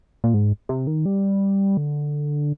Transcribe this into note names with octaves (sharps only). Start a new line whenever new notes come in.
A#2
G#2
C3
D#3
G3
D3